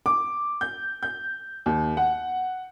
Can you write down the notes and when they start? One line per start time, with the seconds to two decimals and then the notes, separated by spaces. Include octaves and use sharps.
0.06 D6
0.61 G6
1.03 G6
1.66 D#2
1.97 F#5